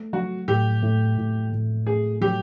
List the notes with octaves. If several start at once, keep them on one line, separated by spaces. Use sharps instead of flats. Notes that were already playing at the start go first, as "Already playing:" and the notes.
Already playing: A3
F#3 F#4
A2 G4
A2
A2
A2
A3 G#4
F#3 G4